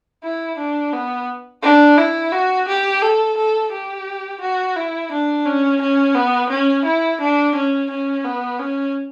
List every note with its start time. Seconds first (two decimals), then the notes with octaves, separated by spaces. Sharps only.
0.23 E4
0.58 D4
0.93 B3
1.63 D4
1.97 E4
2.32 F#4
2.67 G4
3.02 A4
3.37 A4
3.72 G4
4.41 F#4
4.76 E4
5.12 D4
5.45 C#4
5.81 C#4
6.15 B3
6.50 C#4
6.85 E4
7.20 D4
7.55 C#4
7.90 C#4
8.24 B3
8.59 C#4